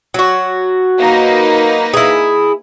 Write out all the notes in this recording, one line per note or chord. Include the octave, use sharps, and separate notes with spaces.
F#3 F#4
A#3 D#4 B4
E4 G#4